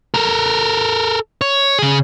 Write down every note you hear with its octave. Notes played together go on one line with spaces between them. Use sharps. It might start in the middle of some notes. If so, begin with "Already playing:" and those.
A4 A#4
C#5
C#3 G#4